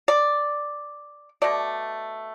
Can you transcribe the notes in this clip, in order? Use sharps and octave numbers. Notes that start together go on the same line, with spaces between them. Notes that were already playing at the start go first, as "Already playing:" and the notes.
D5
B2 A3 D5